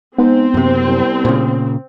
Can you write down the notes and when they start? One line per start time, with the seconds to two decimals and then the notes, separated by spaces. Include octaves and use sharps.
0.18 G#2 B3 C4
0.54 F#1 F#2 C3
0.86 C2
1.25 A#2 C#3